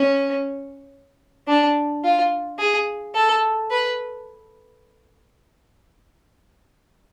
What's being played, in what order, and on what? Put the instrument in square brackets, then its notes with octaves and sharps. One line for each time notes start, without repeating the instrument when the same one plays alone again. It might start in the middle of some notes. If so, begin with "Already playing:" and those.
Already playing: [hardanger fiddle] C#4
D4
F4
G#4
A4
B4